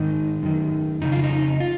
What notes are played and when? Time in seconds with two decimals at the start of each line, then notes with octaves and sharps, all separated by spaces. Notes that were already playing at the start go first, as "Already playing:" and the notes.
Already playing: G#2 D#3 D#4
0.42 F#2 D#3
1.01 F2 C#3 D#4
1.12 F4
1.24 D#4
1.60 F4